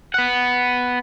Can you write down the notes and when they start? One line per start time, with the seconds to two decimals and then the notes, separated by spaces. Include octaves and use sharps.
0.14 B3 F#5